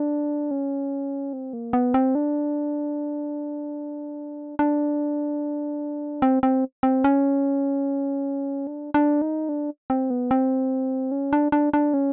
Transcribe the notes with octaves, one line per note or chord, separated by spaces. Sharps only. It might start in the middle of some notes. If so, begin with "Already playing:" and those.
Already playing: D4
C#4
C4
A#3
B3
C4
D4
D4
C4
C4
C4
C#4
D4
D4
D#4
D4
C4
B3
C4
C#4
D4
D4
D4
C#4